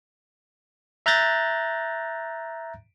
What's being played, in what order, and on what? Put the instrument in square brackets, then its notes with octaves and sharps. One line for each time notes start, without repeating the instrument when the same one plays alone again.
[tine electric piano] E5 A#5 F#6 G6 A6 A#6